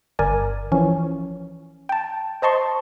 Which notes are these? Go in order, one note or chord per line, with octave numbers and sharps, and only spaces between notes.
G1 A#4 D5 G#5
E3 F3 C#4
G5 A5
C5 D#5 A5 C6 C#6